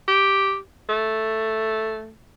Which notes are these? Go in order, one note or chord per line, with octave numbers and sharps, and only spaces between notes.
G4
A3